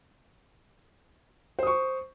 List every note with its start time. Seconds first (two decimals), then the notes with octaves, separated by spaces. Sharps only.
1.59 C5
1.63 D#6
1.67 C#6